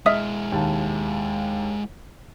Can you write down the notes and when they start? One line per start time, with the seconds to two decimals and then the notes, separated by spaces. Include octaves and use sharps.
0.06 G#3 E4 D#5 E5 D#6 F6
0.52 D#2 A5